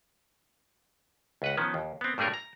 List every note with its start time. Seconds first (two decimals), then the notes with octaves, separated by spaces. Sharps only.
1.42 C#2 B4 F#5
1.57 D#3 F3 B3 C#4
1.74 D#2
2.01 B3 C4
2.18 G2 G3 A3 G#4 A#4 C#5
2.34 A#5